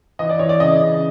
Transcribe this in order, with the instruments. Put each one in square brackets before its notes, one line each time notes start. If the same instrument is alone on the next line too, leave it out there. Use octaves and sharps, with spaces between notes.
[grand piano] E3 [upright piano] D#5
[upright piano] D5
[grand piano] E3 [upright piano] C#5
[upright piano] D5
[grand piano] C#3 [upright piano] D#5
[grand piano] C#3